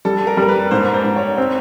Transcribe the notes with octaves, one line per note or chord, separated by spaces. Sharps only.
G3 A4
A#4
G3 A#4
B4
G#2 C5
C5
G#2
C#5
C4